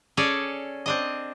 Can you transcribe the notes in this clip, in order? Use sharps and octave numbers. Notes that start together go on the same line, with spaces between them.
C#4 G#4 A4 C#5 D5
C4 D4 D#5